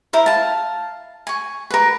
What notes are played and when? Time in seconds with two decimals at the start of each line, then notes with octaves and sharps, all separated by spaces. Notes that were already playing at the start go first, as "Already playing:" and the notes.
0.13 E4 A#4 C5
0.26 F5 A5
1.27 G#5 C#6
1.70 A#4 B4